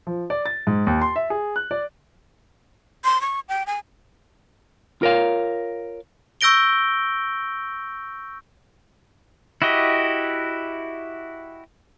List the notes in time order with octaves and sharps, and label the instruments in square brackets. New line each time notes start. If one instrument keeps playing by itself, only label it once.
[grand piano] F3
D5
A6
G#2
D#2
C6
E5
G#4
F#6
D5
[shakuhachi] C6
C#6
G5
G#5
[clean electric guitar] F4 A#4 C#5 F5
[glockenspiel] C#6 E6 G6 A#6 D7 G7
[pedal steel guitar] E4 F#4 G4 D#5